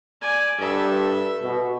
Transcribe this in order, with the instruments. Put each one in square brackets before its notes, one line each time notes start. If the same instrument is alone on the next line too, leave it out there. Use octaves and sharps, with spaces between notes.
[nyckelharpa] D5 G#5
[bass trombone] G2 [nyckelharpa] A4 E5
[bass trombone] B2